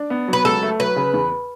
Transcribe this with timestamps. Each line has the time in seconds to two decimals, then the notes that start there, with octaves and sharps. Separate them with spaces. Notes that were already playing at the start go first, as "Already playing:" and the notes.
Already playing: D4
0.10 B3
0.28 F#3 B4
0.45 C#2 A4
0.63 A3
0.80 F#3 B4
0.96 C#3
1.14 E2